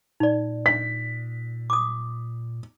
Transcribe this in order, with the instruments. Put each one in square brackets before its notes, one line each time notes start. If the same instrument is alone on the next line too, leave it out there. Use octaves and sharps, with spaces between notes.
[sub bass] A#2 [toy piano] D#4 D5
[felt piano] B6
[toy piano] D6 D#6